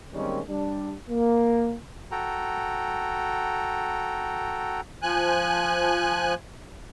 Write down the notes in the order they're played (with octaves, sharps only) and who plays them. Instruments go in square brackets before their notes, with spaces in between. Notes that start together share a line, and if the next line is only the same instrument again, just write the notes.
[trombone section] D#3 G3 G#3 A#3 C4 C#4
G3 D4
A#3
[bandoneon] F#4 A4 G5 A#5
[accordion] F3 G#5 F#6